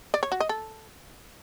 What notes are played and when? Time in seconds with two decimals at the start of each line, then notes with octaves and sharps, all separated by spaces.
0.14 D5
0.23 C#5
0.32 F#4
0.40 D#5
0.49 A4